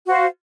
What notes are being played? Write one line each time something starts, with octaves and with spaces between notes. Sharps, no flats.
F#4 C5 F5